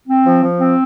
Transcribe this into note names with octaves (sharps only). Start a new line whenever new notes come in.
C4
F3
F3
C4